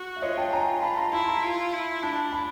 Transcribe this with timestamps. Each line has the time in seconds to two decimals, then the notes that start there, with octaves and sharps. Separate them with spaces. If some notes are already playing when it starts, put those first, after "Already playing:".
Already playing: F#4
0.16 E5
0.22 F4 C#5 D#5
0.38 G5 A5
0.52 G#5 A#5
0.82 A5 B5
0.97 A#5 C6
1.12 E4 A5 B5
1.28 A#5 C6
1.43 F4
1.73 E4
2.02 D4 A5 B5
2.32 A5 B5